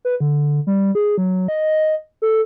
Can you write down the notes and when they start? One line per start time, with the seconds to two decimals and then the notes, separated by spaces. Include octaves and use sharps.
0.05 B4
0.20 D3
0.67 G3
0.95 G#4
1.18 F#3
1.48 D#5
2.22 A4